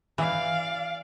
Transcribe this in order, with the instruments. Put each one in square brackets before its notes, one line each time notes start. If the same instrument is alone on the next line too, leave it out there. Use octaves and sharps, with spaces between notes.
[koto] E3 [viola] D5 F5